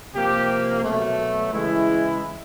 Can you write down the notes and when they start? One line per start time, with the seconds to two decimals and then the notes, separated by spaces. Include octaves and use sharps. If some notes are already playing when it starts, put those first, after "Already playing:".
0.14 C3 F3 A#3 G4
0.84 B2 F#3 A3
1.53 C#3 E3 G#3 E4